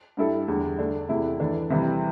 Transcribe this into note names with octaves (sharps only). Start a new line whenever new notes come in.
G2 G3 E4 A4
E2 D3 G3
D3 A3 D4
E2 C3 A3 E4
E3 A3 D4 A4
C3 E3 G3